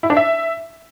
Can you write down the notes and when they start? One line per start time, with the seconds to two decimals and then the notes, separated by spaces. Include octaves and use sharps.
0.03 E4
0.10 D4
0.17 E5